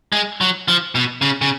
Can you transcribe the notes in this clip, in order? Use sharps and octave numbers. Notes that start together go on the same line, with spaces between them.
G#3
F#3
F3
B2
C#3
C#3